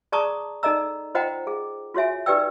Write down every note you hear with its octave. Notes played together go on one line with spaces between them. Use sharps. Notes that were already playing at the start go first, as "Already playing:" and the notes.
G#4 D5 A5 A#5 C#6 D#6
D#4 A4 D5 D#5 A#5 E6
F4 C5 D#5 F#5 G5 A#5
G#4
F4 F#4 C#5 E5 G#5
D#4 G4 B4 D5 G5 E6